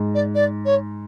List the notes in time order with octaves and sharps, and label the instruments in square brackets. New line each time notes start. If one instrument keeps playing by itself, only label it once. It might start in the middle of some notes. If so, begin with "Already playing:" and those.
Already playing: [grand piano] G#2
[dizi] D5
D5
C#5